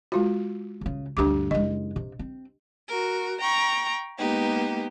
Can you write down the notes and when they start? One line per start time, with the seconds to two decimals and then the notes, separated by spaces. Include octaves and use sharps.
0.12 G#3 F4 F#4
0.81 C#2 C#3
1.17 D2 G2 D4 G4 D6
1.51 F#1 G#3 D#5
1.96 C3
2.19 C4
2.88 F#4 A#4
3.40 G5 A#5 C#6
4.18 G#3 A#3 B3 D#4 G4